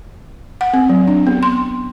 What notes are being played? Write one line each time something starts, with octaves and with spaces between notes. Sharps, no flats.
F#5
C4
F#3
D4
B3
C6